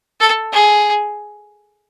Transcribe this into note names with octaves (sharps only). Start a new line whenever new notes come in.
A4
G#4